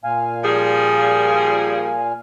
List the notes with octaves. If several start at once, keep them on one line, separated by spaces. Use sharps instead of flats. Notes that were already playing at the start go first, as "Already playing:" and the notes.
A#2 F5 G#5
F3 G3 G#4